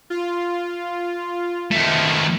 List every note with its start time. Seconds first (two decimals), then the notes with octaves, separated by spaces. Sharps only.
0.10 F4
1.71 D#3 A3